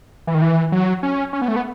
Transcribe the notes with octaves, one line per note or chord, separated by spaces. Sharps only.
E3
D#3
E3
F#3
C#4
C#4
B3
A3
B3